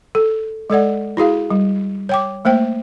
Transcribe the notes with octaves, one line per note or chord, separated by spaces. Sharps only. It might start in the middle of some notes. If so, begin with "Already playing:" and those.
A4
G#3 A4 D5 F#5
E4 F#4 G#4 F5
G3
C#5 G5 D6
A3 A#3 C5 G5